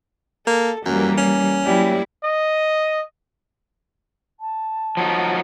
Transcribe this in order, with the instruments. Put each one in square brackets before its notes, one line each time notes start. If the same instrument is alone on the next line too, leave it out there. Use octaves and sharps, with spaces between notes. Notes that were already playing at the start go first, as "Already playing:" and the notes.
[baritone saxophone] A#3 [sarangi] A4
[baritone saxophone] F#2 [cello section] E3 G3 [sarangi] A#3
[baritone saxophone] C#4
[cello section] F#3 A#3 E4 [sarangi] G3
[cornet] D#5
[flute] A5
[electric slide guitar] F3 F#3 D#4